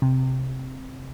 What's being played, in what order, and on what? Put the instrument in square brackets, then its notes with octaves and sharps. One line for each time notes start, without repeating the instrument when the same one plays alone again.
[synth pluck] C3